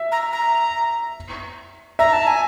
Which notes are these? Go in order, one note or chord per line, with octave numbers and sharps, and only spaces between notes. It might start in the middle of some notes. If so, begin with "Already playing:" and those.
Already playing: E5
A#5
A#5
E5 A#5
A5
G#5